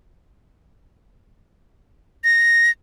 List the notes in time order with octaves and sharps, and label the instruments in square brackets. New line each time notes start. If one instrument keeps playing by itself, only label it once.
[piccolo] A#6